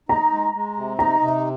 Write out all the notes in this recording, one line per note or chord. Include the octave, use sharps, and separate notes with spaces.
D#4 A#5
G#3
G#3
C3
D#4 A#5
C3